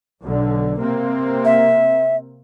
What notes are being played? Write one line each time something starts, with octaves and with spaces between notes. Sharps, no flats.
B1 D3
C3 A#3 C4
E5